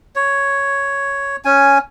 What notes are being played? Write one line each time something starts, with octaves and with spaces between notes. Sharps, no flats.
C#5
C#4 G#5